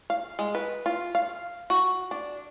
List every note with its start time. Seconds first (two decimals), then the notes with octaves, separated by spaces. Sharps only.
0.10 F5
0.39 G#3
0.55 B4
0.86 F4
1.15 F5
1.70 F#4
2.11 D4